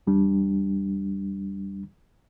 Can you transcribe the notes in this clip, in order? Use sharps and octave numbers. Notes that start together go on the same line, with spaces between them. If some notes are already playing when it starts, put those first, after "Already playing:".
E2 G3 D4